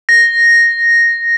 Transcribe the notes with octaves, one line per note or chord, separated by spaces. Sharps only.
A#6